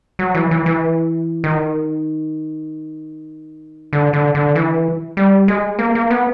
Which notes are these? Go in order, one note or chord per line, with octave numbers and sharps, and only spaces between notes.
F#3
E3
E3
E3
D#3
D3
D3
D3
E3
G3
G#3
A#3
A#3
B3